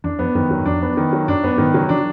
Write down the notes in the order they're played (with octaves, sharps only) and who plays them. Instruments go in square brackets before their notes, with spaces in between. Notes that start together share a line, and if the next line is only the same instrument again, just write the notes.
[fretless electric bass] E2 [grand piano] D4
[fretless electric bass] F2 [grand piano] B3
[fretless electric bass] F#2 [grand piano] D#3
[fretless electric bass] E2 [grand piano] F#3
[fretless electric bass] F#2
[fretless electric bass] F2 [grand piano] D4
[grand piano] B3
D#3
F#3
[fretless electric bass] F#2 [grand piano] D4
[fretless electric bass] F#2 [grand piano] B3
[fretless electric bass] G#2 [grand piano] D#3
[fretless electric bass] C#3 [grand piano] F#3
[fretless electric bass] E3 [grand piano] D4